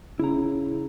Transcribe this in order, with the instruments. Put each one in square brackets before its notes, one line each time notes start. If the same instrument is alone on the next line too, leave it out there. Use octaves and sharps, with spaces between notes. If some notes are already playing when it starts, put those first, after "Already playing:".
[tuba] C#3 [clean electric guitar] E4 A#5